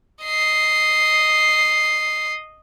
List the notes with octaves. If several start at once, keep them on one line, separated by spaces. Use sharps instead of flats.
D#5 C7